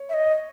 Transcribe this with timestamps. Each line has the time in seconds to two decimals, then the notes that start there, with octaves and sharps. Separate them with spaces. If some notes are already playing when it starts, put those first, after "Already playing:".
Already playing: C#5
0.09 E5
0.14 D#5